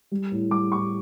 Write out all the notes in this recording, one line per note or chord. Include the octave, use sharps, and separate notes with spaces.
G3
A2
G3 D6
A2 C#6